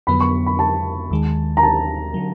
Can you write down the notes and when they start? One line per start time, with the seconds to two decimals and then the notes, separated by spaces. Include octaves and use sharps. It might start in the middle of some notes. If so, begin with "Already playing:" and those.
0.07 F2 D3 F#3 B3 B5
0.20 C#6
0.46 B5
0.59 A5
1.11 D#2 D#3 G#3
1.57 A#5
1.63 A5
2.14 D3 F#3